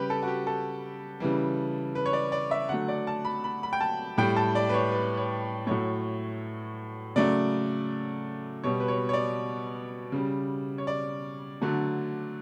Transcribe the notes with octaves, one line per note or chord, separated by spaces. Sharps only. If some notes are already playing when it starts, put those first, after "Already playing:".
Already playing: C#3 G3 G4 B4
A4
F#4
G4
A4
C#3 E3 G3
B4
C#5
D5
D5
E5
D3 F#3 A3 F#5
D5
A5
B5
B5
B5
G5
A5
A2 G3 G5
A5
D5
B4
C#5
B4
C#5
A2 F#3 A3 C#5
C#3 F#3 A3 D5
B2 G3 C#5
B4
C#5
C#5
D5
C#3 G3
C#5
D5
D3 F#3 A3